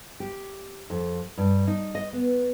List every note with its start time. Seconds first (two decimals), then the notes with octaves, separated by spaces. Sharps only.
0.20 G4
0.90 F2
1.38 G2
1.67 D#4
1.95 D#5
2.13 B3